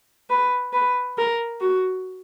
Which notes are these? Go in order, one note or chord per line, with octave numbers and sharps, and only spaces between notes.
B4
B4
A#4
F#4